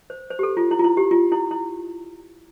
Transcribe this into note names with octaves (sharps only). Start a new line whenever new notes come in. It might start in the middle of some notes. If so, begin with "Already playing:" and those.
C5
C5
G4
A4
F4
E4
F4
E4
G4
F4
E4
E4